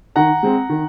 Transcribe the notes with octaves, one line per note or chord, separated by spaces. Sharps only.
D#3 F#5 A#5
G#3 C4
D#3